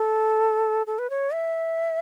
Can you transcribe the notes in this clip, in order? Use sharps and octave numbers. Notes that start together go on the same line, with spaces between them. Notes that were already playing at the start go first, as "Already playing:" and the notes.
Already playing: A4
A4
B4
C#5
E5